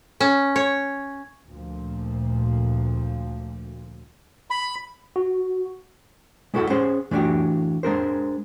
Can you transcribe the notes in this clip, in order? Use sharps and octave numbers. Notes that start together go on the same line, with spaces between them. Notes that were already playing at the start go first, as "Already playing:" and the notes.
C#4
C#5
D2 A#2 F3
B5
F#4
G#3 E4 F#4 A4 D#5 F#5
C#4 G#4 C5 F#5 C6
E3 A3 D4 F#4 G4
G#3 D4 A#4 C5